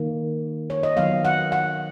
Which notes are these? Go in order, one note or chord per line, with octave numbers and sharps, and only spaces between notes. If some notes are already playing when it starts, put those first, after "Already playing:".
Already playing: D#3 A#3
C#5
D#5
D#3 F#3 B3 F5
F#5
F#5